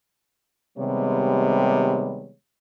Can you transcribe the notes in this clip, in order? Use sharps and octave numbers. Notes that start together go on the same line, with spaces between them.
C3 D#3 G3 G#3 B3 C#5